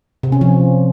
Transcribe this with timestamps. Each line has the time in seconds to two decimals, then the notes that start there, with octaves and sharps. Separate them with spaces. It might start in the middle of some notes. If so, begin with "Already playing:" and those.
0.23 C3
0.32 C#4
0.41 F3